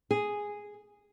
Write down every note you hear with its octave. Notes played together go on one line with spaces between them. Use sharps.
G#4